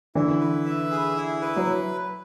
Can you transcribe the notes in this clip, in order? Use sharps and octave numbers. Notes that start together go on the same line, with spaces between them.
D3 E3 E4
B4
E5
G#4
E4
B4
F#3